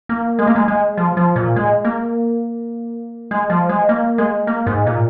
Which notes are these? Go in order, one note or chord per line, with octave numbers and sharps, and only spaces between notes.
A#3
G#3
A#3
G#3
G#3
F3
F3
A#2
G#3
A#3
G#3
F3
G#3
A#3
G#3
A#3
G#2
A#2